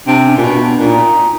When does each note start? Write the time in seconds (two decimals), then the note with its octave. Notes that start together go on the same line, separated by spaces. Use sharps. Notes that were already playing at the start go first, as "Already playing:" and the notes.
0.07 C3 D4
0.25 C#4
0.37 A#2
0.44 B2 D4
0.62 D4
0.79 A#2 D#4